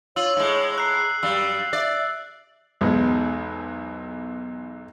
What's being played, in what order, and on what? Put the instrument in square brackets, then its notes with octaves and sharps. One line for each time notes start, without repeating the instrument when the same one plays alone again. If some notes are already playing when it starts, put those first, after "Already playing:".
[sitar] F4 [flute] C#5 [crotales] E6 F#7
[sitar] A2 G#3
[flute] A#5 [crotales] F#6 C7
[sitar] F#2 G3 [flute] F5 [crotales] E6
[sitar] D5 [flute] E5
[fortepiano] B1 E2 G#2 G#3 B3